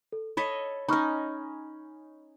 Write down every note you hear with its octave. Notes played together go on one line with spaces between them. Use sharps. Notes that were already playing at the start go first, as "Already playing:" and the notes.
A4
A4 C#5 D#5 B5 B6
C#4 D#4 B5 C#6 F6